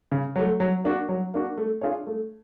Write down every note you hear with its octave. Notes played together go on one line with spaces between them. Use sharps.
C#3
F#3 A3
F#3
A#3 D4 F#4
F#3
A#3 D4 F#4
A3
D4 F4 G#4 C#5
A3